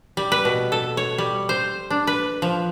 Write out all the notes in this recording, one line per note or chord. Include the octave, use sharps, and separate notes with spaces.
G3
B4
B2
A4
C#5
G3
C5
D4
B4
F3